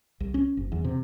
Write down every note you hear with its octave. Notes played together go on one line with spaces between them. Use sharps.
C2
C#4
F#1
E2
C3